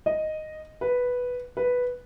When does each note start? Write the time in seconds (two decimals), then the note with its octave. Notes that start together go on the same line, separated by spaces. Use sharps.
0.06 D#5
0.81 B4
1.57 B4